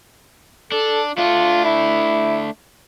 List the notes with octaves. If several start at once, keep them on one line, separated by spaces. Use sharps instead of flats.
D4 A4
A3 D4 F4
E4